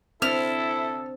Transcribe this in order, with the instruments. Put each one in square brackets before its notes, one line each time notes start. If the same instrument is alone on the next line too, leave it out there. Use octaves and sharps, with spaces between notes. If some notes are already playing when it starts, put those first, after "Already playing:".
[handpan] C4 D4 [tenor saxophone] E4 [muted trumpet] A4 [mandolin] F6